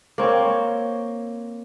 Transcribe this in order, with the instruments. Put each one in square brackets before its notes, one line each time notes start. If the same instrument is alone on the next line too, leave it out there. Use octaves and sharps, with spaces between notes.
[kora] A#3 C4 C#5